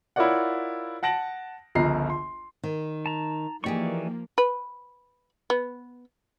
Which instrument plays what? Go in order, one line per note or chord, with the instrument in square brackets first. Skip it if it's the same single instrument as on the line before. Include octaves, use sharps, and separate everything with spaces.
[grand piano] E4 F4 A#4 C#5 D5 F#5
F#5 A5 A#6 D7 F#7
G1 C#2 F3 A#5 C7
C6
[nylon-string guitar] D#3
[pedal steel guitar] A5 A#5
[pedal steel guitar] E3 D5 C#6 [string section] F3 A#3 [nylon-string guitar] D#4 G4 G#4
[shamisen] B4
B3